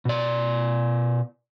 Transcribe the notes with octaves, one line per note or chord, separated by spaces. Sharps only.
B2 D5